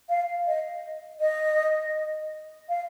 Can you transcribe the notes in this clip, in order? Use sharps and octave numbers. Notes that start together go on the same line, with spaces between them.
F5
D#5
D#5
F5